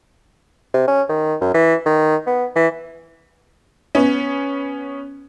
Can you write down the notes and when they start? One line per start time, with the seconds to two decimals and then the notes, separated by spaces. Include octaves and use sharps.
0.74 C3
0.87 C#4
1.09 D#3
1.41 F#2
1.54 E3
1.86 D#3
2.27 B3
2.56 E3
3.95 B3 C#4